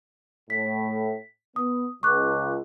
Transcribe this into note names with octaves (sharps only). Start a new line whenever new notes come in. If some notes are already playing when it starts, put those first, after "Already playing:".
A2 B6
B3 D#6
C#2 C#6 D6 F#6